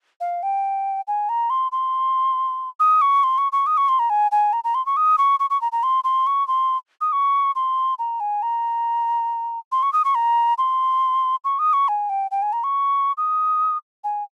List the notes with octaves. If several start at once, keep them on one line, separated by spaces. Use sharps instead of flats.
F5
G5
G#5
A#5
C6
C6
D#6
C#6
C6
C#6
C#6
D#6
C#6
C6
A#5
G#5
G#5
A#5
A#5
C6
C#6
D#6
C#6
C#6
C#6
A#5
A#5
C6
C6
C#6
C6
D#6
C#6
C6
A#5
G#5
A#5
C6
C#6
D#6
C#6
A#5
C6
C#6
D#6
C#6
G#5
G5
G5
G#5
A#5
C#6
D#6
G#5